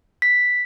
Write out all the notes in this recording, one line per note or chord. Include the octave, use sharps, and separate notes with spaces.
B6